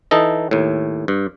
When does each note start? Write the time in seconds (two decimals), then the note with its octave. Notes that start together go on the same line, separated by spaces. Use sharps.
0.11 E3 D#4 A4 D#5
0.51 D#2 A2
1.08 G2